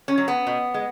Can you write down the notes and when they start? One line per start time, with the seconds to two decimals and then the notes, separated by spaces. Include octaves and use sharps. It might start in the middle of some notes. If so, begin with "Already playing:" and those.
0.08 C#4
0.18 F#3
0.28 B3
0.47 B2
0.74 G#3